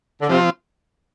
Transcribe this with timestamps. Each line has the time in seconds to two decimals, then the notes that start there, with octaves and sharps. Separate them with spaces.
0.22 D3
0.29 C3 F3 C4 F4